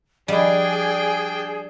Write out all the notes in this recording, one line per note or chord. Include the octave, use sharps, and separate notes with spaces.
F3 G3 D4 G#4 D#5 G5 B5